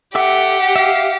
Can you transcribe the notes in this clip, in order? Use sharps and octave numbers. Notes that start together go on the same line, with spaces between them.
G4 A4 E5 F#5 D6
E5 F5